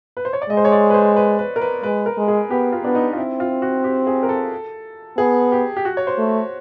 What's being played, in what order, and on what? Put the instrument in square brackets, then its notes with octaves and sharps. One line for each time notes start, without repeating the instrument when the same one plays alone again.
[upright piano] B4
C5
C#5
D5
[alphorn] G#3 [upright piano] D#5
[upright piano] C5
C#5
D5
B4
C5
B4
B4
A#4
B4
[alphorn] G#3 [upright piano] B4
[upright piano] A#4
[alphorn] G#3
[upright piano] G#4
[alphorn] B3 [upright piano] G4
[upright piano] F4
[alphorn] B3 [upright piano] D4
[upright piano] D#4
F4
[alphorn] C4 [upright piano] E4
[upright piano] F4
F#4
G4
G#4
A#4
A4
[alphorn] B3 [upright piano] G#4
[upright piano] G4
G4
F#4
C#5
C5
[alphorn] A3